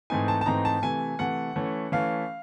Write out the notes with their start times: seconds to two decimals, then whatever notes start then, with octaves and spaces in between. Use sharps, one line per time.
0.10 G#2 E3 A3 C4 D#4 G#5
0.28 A5
0.41 A5
0.46 G#2 E3 A3 C4 D#4 A#5
0.65 A5
0.82 C3 E3 A3 G#5
1.19 C3 E3 A3 F#5
1.56 E3 A3 C#4
1.92 E3 A3 C#4 F5